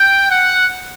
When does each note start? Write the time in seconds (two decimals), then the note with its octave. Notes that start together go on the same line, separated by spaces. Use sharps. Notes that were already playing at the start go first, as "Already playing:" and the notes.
Already playing: G5
0.30 F#5